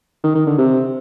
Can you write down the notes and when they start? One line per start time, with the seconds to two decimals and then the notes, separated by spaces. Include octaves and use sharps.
0.23 D#3
0.35 D#3
0.46 D3
0.58 C3